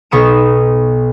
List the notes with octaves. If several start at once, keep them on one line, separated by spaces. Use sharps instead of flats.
B1 B3 C#6 D#6 E7